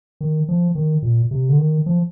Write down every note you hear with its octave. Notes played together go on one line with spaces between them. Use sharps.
D#3
F3
D#3
A#2
C3
D3
D#3
F3